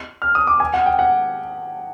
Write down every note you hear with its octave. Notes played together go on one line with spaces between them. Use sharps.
F6
D#6
D6
G#5
F#5
G5
F#5